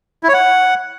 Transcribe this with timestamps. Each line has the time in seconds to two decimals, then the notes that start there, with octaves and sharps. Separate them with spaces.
0.23 E4
0.28 C#5
0.34 F#5